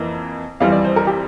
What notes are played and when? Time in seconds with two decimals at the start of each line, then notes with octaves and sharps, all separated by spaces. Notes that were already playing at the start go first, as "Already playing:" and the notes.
Already playing: F2 E3 A#3
0.60 F2 E3 G3 C4 F5
0.72 D5
0.85 C5
0.96 A#4
1.07 G4